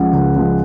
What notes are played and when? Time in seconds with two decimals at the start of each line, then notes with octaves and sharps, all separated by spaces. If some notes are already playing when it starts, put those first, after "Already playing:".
Already playing: C#2 C#3 F3 G#3 F#5
0.13 C#2
0.36 C#3 F3 G#3